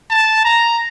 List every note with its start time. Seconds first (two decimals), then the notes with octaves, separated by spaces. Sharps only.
0.10 A5
0.45 A#5